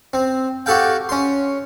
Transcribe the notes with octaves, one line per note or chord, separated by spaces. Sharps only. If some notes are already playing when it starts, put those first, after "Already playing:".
C4
F#4 G4 A4 F5 G5
C#4 C6